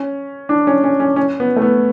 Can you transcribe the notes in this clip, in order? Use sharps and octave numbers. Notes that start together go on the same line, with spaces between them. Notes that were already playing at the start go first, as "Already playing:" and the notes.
Already playing: C#4
D4
C#4
C#4
C#4
C#4
B3
A3
B3